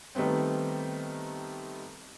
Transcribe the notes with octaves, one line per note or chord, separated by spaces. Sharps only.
D#3 G3 A3 B3 C4